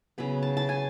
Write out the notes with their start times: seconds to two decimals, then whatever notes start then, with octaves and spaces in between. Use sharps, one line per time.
0.18 C#3 F#3 B3 B5
0.43 A5
0.57 A5
0.69 G#5